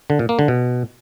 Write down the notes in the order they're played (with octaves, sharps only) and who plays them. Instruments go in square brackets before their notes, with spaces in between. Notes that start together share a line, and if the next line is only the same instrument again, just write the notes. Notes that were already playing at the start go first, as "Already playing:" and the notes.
[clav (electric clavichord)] D3
A#2
A#3
D3
B2